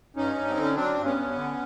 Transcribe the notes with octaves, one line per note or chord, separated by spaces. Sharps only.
G2 C#4 D#4
G2
C4
D3
C#4
F#3 C4 D4
G2
B3 C#4
G2
D3